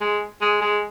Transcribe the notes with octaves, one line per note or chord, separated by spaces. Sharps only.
G#3
G#3
G#3